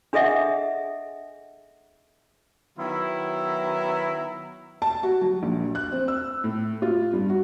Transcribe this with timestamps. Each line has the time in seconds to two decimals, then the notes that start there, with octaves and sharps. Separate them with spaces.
0.13 D4 G#4 A4 D#5 E5 F#5
2.78 D#3 F#3 B3 E4
4.82 A5
5.03 F#4
5.21 F#3
5.43 A#1
5.75 F#6
5.92 C4
6.08 E6
6.44 A2
6.82 F4
7.13 G2
7.29 F#4